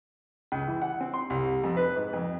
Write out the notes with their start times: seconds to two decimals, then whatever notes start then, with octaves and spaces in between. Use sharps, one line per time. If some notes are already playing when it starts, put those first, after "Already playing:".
0.52 C#2
0.67 E3
0.82 F#5
1.01 C4
1.14 C6
1.30 C2
1.64 F2
1.77 B4
1.96 G#2
2.13 F2